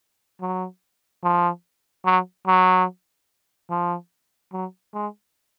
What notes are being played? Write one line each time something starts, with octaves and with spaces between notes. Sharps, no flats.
F#3
F3
F#3
F#3
F3
F#3
G#3